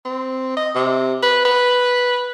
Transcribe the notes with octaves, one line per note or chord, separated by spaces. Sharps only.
C4
D#5
C3
B4
B4